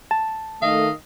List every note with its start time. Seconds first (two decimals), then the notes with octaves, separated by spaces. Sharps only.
0.11 A5
0.62 D#3 A3 D#5 F5